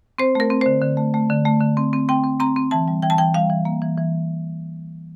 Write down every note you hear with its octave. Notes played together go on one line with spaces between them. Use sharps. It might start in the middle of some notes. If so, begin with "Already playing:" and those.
C4 C5
A3 A#4
C4
D3 C5
D3
A3
A3
D3
A3
D3
C4
C4
C4 G5
C4
C4 A#5
C4
E3 A5
G3
E3 G5
A5
E3 G5
G3 F5
E3
A#3
E3
E3